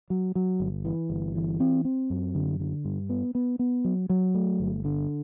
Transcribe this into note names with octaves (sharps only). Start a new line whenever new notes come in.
F#3
F#3
G1
E3
G1
E3
C4
C4
F#2
D3
D3
G2
B3
B3
B3
F#3
F#3
A3
G1
D3